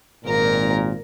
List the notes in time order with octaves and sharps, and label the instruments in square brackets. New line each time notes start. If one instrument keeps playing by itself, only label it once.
[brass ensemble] G#1 A#2 [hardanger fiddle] A#4 A#5